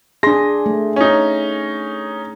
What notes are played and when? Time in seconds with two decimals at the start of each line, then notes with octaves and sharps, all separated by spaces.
0.23 D4 G#4 C6 A#6
0.66 A3
0.96 C#4 D#4